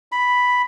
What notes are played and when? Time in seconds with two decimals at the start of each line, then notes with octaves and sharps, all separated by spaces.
0.12 B5